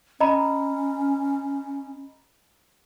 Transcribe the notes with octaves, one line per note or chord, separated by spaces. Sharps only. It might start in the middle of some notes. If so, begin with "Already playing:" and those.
C#4 D#5 A#5 B5